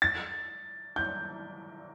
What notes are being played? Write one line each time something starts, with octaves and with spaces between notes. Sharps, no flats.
A6
G6